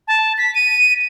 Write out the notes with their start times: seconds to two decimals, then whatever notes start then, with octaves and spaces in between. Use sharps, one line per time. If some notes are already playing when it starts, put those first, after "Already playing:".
0.08 A5
0.38 B6
0.55 D#7